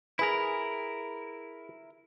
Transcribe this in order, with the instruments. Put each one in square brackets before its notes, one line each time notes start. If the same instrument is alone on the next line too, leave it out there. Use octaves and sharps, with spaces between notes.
[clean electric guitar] E4 A#4 [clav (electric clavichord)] G#4 B4 [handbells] B5